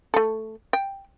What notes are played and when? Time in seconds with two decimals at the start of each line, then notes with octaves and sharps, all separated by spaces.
0.14 A3 A4
0.73 G5